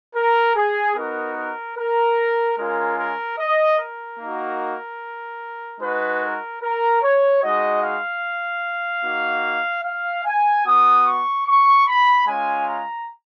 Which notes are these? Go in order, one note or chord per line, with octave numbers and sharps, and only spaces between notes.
A#4
G#4
B3 D#4 F#4 A#4
A#4
A#4
G#3 C#4 F4 A#4
A#4
D#5
A#4
A#3 D#4 F#4
G#3 D#4 F#4 B4
A#4
A#4
C#5
G#3 D#4 F#4 D#5
F5
A#3 D#4 F#4
F5
G#5
B3 F#4 D#6
C#6
C#6
B5
G#3 C#4 F4 G#5
A#5